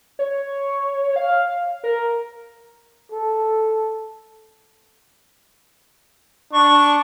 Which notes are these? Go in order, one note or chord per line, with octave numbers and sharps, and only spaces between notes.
C#5
F5
A#4
A4
D4 C#6